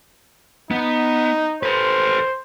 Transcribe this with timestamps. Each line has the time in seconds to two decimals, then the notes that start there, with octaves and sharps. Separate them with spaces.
0.71 B3 D#4
1.63 A4 B4 C5